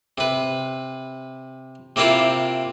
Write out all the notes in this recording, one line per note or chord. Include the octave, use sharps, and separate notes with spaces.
C3 B4
C3 A#3 C4 E4 F4 G4